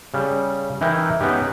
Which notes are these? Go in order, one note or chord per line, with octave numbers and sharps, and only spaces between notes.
C#3 G3
E3 D#4 E4 A#4 G5
B3 C#4 D#4 G4